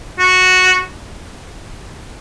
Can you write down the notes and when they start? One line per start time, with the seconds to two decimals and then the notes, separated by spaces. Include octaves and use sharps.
0.19 F#4